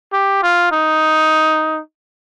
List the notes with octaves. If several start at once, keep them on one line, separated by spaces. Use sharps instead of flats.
G4
F4
D#4